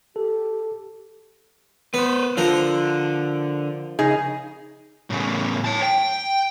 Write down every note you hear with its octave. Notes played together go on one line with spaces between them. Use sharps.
G4 A4
B3 B4 C5
D3 F3 A#4
C#3 D#4 G#4
A2 C#3
C#5 A5
G5